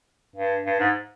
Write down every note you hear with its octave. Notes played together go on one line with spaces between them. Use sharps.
G2
G2
G#2